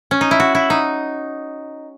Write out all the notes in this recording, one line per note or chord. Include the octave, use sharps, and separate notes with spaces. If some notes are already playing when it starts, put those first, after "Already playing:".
C#4
D#4
E4
F#4
E4
D#4